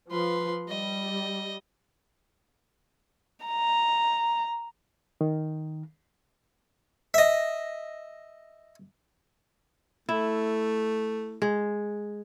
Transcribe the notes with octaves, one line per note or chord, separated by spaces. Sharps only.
F3 B4 C6
G3 D#5
A#5
D#3
D#5 E5
A3 E4
G#3